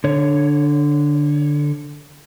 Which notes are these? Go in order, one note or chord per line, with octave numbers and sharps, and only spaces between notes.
D3 C#5